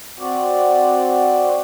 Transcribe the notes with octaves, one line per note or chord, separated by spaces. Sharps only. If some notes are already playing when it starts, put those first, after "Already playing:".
C4 F#4 D5